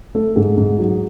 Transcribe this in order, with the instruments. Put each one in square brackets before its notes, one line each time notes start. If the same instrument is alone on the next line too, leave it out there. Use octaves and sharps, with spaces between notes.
[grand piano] A3 [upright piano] A4
[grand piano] G#2 [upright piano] G#4
[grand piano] G#2
F#3